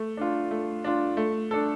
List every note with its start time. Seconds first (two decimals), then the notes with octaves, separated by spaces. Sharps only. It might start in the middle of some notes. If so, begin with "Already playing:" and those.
Already playing: A3
0.17 D4 F4
0.51 A3
0.84 D4 F4
1.17 A3
1.51 D4 A4